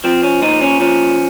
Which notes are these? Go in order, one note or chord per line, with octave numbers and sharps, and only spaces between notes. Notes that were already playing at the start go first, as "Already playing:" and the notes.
F3 C4
C#4
A#2 D#4
C#4
F3 C#4